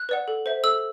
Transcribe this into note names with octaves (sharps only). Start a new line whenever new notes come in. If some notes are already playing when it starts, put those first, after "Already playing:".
Already playing: F#6
B4 D5 F#5
A4
C5 E5
A4 E6